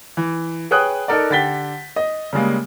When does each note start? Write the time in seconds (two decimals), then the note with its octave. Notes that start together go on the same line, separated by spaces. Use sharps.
0.17 E3
0.71 G#4 B4 C#5 G5 D#6 F#6
1.08 D#4 A4 A#4 D5
1.30 D3 G4 G5 A6 B6 G7
1.96 D#5
2.33 C#3 G3 G#3 A#3